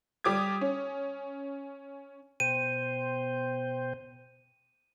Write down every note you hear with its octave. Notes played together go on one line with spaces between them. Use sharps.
G3 G4 D6 D#6 G#6
C#4
B2 C5 G5 D#7